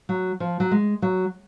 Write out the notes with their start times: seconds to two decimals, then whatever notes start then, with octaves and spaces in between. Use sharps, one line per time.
0.09 F#3
0.40 F3
0.60 F#3
0.71 G#3
1.02 F#3